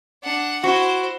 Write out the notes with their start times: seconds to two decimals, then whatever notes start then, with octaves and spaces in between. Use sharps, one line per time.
0.23 D4 F#5
0.64 E4 F#4 C5